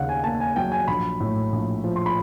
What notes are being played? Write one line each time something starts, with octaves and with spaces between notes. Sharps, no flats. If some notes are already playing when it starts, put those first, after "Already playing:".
Already playing: D#2 C#3 F5 F#5
G#5
A#3 A5
G#5
F#3 G5
G#5
A#1 B5
A2
A#1
F3
C6
B5